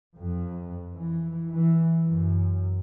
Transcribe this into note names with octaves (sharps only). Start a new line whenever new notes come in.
F2
E3
E3
F#2